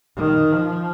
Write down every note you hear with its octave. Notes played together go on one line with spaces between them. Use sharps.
D#3
F3